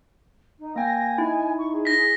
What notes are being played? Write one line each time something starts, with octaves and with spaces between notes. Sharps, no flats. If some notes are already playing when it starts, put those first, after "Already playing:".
D#4
A#3 G5 G#5 A#6
D#4 E4
C#6
G#4
A#6 B6